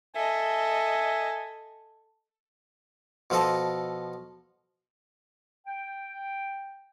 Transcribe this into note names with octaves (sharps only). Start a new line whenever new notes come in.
A4 D#5 E5 G#5
B2 F3 A4 D#5 A5
G5